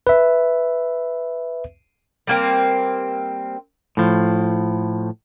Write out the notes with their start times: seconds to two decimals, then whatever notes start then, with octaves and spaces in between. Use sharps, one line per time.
0.07 B4 E5
2.27 G3 A#3 C4
3.97 A2 F3